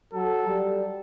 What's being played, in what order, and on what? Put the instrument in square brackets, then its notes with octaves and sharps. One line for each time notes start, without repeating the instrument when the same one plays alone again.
[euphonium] F#3 [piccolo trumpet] A4
[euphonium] G3